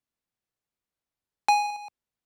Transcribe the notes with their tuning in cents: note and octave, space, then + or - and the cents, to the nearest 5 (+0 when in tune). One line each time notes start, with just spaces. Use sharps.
G#5 -5